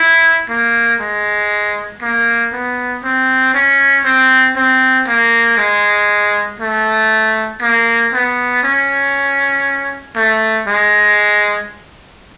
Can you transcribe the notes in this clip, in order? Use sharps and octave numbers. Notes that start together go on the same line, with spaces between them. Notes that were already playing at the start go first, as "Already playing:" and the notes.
Already playing: E4
A#3
G#3
A#3
B3
C4
C#4
C4
C4
A#3
G#3
A3
A#3
B3
C#4
A3
G#3